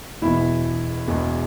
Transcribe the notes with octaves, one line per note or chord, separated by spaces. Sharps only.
E1 E2 B2 E4
E1 E2 B2